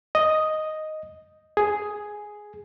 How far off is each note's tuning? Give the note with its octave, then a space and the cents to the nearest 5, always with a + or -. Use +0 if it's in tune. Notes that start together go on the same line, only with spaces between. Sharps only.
D#5 +0
G#4 +5